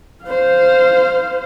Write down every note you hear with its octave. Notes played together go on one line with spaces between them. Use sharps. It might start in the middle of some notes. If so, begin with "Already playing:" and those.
C5 F5